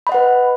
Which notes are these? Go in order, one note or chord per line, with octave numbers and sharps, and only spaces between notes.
B4 D#5 F#5 B5